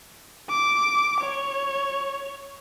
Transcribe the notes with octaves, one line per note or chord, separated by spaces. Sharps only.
D6
C#5